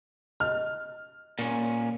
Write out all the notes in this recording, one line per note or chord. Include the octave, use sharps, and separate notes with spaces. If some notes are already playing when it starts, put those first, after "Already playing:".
C#4 D#5 F6
A#2 C#4 C#6 D6